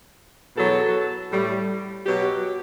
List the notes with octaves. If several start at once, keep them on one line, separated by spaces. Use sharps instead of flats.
E2 B2 F#3 A4
A2 G3
B2 F#3 G4